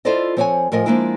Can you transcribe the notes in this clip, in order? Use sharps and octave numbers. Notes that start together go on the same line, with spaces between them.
E4 F4 A4 C5 D5 D#5
F3 C4 C#5 F5 F#5 G#5
A2 F3 A#4 D#5 G#5
F3 F#3 G#3 A#3 D4 E4